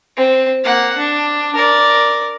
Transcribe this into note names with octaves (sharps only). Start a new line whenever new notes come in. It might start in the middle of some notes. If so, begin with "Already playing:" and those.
C4
A#3 F#5
D4
A#4 D5